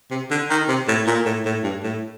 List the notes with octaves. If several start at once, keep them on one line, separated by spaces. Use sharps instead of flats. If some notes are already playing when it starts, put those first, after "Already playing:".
C3
D3
D#3
C3
A2
A#2
A2
A2
G2
A2